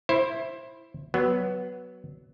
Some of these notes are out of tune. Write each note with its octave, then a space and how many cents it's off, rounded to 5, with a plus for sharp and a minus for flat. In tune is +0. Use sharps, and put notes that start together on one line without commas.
E4 +5 C5 +20
F#3 +15 B3 +0